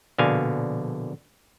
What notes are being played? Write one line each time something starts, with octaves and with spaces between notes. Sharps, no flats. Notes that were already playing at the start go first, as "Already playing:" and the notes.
A#1 B2 D3 F5 G#5